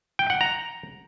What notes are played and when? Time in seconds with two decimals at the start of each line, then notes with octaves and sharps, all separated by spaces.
0.19 G5
0.30 F#5
0.41 A#5